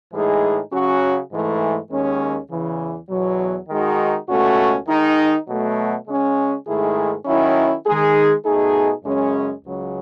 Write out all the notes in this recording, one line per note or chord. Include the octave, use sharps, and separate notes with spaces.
A2 E3 G#3 D#4 G#4
C#3 F#3 C#4 F#4
G#2 E3 A3
D#2 D#3 G#3 C#4
E2 C#3 E3
E2 B2 F#3
D#3 G#3 D#4 F#4
C#2 B2 A3 C#4 F#4
D#3 G#3 D#4
B2 F#3 A3
C#3 G#3 C#4
G#2 D#3 A3 E4 G#4
D#3 F#3 C#4 E4
D#3 G#3 D#4 G#4
B2 A3 D#4 G#4
F#2 C#3 G#3 C#4
C#2 C#3 F#3